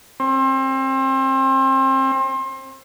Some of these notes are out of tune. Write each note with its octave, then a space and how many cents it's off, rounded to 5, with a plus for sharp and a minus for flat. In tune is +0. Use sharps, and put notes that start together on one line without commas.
C4 +30